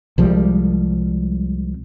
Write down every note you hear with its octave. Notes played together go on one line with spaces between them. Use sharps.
C2 F3 G3 G#3